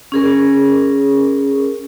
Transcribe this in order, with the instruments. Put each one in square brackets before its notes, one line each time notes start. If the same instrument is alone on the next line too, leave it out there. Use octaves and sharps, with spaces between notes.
[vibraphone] C#4 G#4 A#4